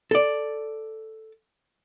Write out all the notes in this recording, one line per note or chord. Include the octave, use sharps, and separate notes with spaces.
A4 D5